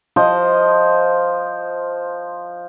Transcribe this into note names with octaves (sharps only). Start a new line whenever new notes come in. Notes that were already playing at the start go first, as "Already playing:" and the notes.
F3 C5 D#5